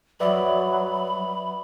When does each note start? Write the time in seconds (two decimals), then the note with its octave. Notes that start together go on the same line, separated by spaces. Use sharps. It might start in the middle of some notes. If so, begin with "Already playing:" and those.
0.20 F#3 B4 D5 E5 B5